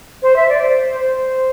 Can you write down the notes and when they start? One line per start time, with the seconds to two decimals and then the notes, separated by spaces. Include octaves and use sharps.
0.23 C5
0.36 E5
0.49 D5
0.62 C5
1.00 C5